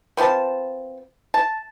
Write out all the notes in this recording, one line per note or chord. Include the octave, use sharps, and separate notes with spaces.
B3 C4 F4 A5
A5